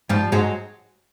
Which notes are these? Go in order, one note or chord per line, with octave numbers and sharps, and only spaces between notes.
G#2 F3 G3
G#2 F#3 G#3